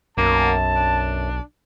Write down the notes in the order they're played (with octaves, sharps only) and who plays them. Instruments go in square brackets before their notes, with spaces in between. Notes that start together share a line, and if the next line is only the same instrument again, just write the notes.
[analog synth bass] B1 [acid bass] F#2 [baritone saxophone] A#3 [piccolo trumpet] A5
[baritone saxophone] D4